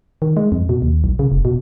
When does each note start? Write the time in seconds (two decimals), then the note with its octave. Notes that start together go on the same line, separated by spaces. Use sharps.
0.22 D#3
0.37 G#3
0.52 F2
0.69 B2
0.82 D#2
1.04 B1
1.19 C#3
1.32 F1
1.45 B2